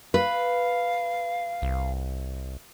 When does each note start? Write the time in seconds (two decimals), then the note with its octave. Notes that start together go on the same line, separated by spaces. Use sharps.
0.14 B4 F5
1.62 C2